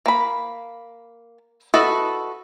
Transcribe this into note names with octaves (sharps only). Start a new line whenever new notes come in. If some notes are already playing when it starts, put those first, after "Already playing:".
A#3 B5
E4 F#4 A4 B4 D#5